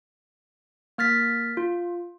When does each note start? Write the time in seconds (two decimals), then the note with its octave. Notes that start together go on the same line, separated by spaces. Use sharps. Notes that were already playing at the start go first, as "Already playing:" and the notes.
0.98 A#3 F6 A6 B6
1.57 F4